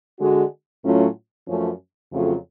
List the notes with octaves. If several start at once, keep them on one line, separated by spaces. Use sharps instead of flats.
D3 G#3 D4 F#4
A2 F#3 A3 C#4 F4
F#2 F3 A3 C#4
F2 C#3 F#3 A3 F4